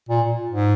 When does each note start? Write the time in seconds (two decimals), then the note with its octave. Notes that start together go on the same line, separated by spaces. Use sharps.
0.09 A#2
0.51 G#2